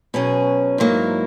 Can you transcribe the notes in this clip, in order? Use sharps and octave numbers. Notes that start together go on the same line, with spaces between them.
B2 F#3 C#4 G#4
G#2 F#3 A#3 E4